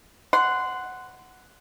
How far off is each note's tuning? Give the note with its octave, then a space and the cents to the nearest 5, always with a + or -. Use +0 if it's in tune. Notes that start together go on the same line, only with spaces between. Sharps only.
F#5 +0 C6 -15